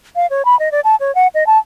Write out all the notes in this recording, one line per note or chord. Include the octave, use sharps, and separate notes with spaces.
F5
C#5
B5
D#5
D5
A5
C#5
F#5
D#5
A5